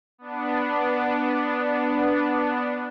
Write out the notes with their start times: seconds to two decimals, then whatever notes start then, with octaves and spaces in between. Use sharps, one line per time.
0.18 B3 D4